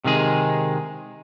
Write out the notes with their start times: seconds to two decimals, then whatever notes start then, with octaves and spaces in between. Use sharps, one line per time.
0.04 C3 D#3 G#3 G#4